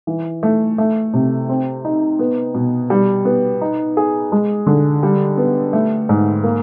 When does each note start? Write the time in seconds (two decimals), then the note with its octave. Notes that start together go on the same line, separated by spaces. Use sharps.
0.07 E3
0.43 A3
0.78 A3
1.14 C3
1.49 C4
1.85 D#4
2.19 B3
2.55 B2
2.90 G3
3.25 B3
3.61 D#4
3.97 G#4
4.32 G#3
4.67 D3
5.03 G3
5.37 B3
5.73 A3
6.09 G#2
6.44 A#3